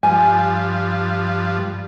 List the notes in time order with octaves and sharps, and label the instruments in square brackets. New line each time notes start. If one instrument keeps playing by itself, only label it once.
[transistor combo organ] G2 F3 [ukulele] G#5